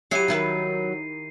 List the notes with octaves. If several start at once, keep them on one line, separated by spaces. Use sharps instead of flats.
F#3 E4 G4 C7 D#7
D#3 E4 B4